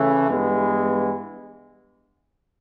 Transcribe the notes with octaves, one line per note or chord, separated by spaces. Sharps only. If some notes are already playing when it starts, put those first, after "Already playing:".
Already playing: C#3 E3 A3
G2 E3 G#3 B3